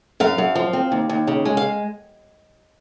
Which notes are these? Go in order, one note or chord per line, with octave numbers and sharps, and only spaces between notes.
F#2 F5
F#2
F3
C4
D#2
D#2
C#3
G#3
F5